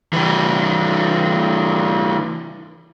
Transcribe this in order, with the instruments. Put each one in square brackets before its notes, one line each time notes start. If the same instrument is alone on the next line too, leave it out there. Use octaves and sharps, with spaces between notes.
[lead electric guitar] E3 G3